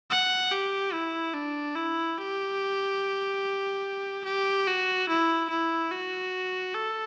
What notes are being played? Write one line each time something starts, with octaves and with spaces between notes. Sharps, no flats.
F#5
G4
E4
D4
E4
G4
G4
F#4
E4
E4
F#4
A4